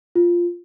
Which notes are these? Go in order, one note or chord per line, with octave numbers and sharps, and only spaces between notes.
F4